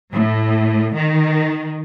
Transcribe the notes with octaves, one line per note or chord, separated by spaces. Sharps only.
A2
D#3